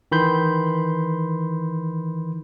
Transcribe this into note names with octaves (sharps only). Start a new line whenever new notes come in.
D#3 E3 B5 C6 G6